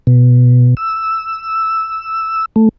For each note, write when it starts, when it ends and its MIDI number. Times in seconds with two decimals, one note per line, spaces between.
0.07 0.74 47
0.77 2.45 88
2.56 2.69 57